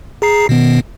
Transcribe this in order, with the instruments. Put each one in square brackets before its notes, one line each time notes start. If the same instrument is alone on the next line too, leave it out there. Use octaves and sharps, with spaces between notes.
[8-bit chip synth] G#4 A#5 C7
B2 D#3 B3